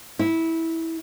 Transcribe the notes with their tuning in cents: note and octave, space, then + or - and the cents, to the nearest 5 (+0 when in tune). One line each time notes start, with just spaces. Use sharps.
E4 -15